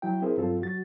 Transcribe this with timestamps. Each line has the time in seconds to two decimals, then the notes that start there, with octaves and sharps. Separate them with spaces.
0.02 F#3 E4 G5
0.22 C4 E4 G#4 A#4 C5
0.37 G2 F#3 C4 F4 A4
0.61 F#3 F#4 A6